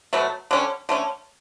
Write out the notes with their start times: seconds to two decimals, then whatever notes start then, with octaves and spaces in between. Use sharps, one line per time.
0.13 B2 F#3 A3
0.51 D3 G3 C#4
0.89 D3 A3 C#4